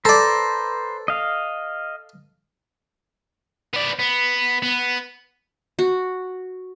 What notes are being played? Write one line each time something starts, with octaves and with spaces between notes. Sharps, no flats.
A4 B4 C5 D5 A#5
D#5 F5
B3 D5
B3
B3
F#4